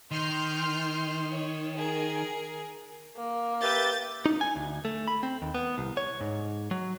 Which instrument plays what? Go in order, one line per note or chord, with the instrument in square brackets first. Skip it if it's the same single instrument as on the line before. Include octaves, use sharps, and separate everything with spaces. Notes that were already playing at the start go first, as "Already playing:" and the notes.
[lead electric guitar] D#3 [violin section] C6 F6 G6
[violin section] C#5
G#4 A#4
[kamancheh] A#3
[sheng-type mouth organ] G4 B4 E5 [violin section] G6 A6
[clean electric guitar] D#4
G#5
D2
A3
B5
C4
D#2
B3
C2
C#5
G#2
F#3